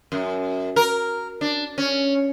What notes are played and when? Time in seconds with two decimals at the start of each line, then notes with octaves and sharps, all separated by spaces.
0.12 F#2
0.76 A#4
1.41 D4
1.78 C#4